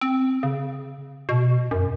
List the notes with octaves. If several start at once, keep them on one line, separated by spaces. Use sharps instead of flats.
C4
C#3
B2
F#2